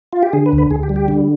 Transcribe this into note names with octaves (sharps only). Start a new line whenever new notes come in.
F4
G4
D3 G#4
B4
D2
B4
D2 G#4
G4
G3
G4
D3